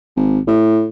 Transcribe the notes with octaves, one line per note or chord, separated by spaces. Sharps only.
G#1
A2